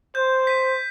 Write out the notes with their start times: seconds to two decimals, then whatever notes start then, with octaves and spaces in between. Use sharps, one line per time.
0.15 C5 G6
0.47 B6 D#7